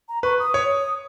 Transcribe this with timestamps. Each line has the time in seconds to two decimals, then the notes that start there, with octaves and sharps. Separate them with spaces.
0.09 A#5
0.23 B4 C#6
0.39 D#6
0.54 C#5